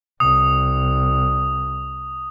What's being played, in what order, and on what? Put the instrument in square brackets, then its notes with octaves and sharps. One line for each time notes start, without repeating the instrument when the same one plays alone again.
[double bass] C2 [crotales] D#6